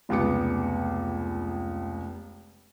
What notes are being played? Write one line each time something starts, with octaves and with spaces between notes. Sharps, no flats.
F1 C#2 B3 D6 C#7